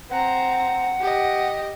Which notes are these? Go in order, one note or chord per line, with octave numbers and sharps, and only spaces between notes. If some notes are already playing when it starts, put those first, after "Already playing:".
C4 F#5 A#5
G4 D#5